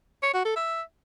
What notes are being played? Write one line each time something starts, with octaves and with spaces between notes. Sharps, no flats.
C#5
F#4
A4
E5